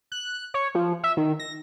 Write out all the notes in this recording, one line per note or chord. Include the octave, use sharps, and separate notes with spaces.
F#6
C#5
F3
E5
D#3
A#6